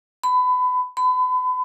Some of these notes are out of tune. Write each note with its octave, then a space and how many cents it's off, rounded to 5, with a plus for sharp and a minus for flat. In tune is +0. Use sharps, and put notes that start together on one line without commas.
B5 +25
B5 +35